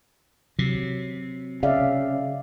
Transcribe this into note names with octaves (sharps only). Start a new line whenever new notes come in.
C3 F#3
C#3 D5 E5 F5